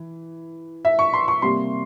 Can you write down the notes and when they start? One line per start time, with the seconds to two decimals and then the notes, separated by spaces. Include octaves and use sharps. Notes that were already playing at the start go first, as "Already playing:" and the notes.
Already playing: E3
0.85 E5
0.99 C#6
1.14 C6
1.28 C#6
1.42 C3 G3 A#3 C6